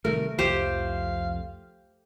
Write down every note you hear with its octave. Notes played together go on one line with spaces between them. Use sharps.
C3 D#3 G3 A3 A#4
C2 F2 F3 G4 C5 F5